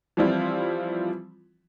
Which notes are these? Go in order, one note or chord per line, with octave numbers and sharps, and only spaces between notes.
E3 F3 G3 C4 E4 F4